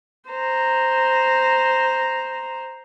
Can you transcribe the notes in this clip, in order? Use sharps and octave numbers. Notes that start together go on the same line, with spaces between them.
C5 A#5